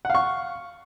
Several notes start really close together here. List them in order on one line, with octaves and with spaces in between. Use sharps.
F#5 F5 C#6